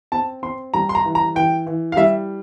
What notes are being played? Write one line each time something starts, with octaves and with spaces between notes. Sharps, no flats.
C4 A5
C4 C6
G3 A#5
C6
A#5
E3
A#5
E3 G5
E3
F5
G3 E5